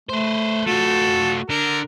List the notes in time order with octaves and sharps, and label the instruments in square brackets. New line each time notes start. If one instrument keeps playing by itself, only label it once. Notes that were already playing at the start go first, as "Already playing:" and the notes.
[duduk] A3 [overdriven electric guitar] B4 C5
[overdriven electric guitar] A3 F4 [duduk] F#4 [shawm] A4
[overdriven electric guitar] D3 [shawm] A#4